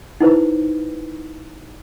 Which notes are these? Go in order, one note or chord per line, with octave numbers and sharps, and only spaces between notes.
D#4 E4 B4 C5